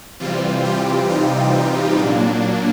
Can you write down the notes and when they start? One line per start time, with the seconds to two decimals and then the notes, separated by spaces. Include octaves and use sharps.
0.20 C3 E3 G3 C4 F4
0.65 G4
1.09 D#4
1.54 D#4
1.98 A#2 F#3 A#3 D4